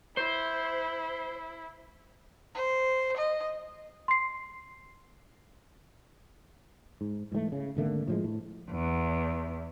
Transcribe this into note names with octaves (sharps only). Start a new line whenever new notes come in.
E4 C5
C5
D#5
C6 C7
G#2
G#2 E3 F#3 A3
C#3
G#1 D3 A3 A#3
A2 F3 G#3
A2
E2